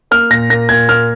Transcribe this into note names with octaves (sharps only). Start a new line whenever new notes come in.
A#3 F6
A#2 A#6
A#3 A#6
A#2 G#6
A#3 F6